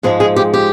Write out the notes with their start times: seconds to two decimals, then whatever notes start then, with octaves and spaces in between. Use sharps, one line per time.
0.03 G#2 F3 G#3 G#4
0.20 G#4
0.36 G4
0.54 G4